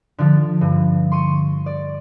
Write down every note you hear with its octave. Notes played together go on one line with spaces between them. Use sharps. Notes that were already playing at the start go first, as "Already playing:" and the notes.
D3 F3
G2
C6 C#6 D#7
D5